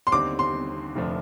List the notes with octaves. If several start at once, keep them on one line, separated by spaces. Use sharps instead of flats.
C6
D#2 D3 G3 C4 D6
C6
F1 F2 D3 F3 A3